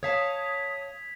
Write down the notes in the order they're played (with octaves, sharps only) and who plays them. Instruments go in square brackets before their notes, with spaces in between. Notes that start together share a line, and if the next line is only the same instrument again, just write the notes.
[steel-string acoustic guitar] C#5 F5 A5 [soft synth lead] D#6 [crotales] G#6 B6 F7